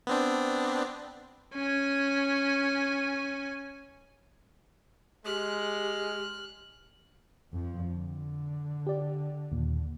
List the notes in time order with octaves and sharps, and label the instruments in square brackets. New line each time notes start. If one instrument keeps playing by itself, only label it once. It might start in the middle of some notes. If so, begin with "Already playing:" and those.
[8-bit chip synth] B3 C4 D4
[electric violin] C#4 G#5
[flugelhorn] G#3 [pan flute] G4 [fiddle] F6 F#6
[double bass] F2 F3
D3
[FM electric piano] G4 D5
D#2 A#2